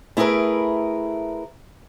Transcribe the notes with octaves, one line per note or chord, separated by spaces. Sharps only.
A3 E4 G#4 A#4 B4